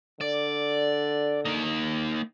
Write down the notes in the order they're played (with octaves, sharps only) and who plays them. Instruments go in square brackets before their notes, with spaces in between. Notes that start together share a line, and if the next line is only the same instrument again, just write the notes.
[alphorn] D3 [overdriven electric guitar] D5
[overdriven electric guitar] A#3 D#4